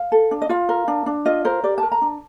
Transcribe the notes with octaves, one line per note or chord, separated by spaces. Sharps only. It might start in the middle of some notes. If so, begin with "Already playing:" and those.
Already playing: F5
A4
D4
D#5
F4 F5
A#4
D4
D4
F4 D#5
A#4 C5
G4 D5
A#4 A5
A#5
D4